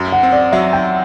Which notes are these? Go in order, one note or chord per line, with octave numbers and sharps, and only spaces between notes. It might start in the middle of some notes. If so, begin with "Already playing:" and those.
Already playing: F#2
F#5
C4
D5
F#3 E5
G5